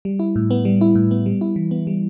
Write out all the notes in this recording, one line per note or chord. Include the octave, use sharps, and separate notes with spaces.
G3
E4
A2
B3
G3
E4
A2
B3
G3
E4
E3
B3
G3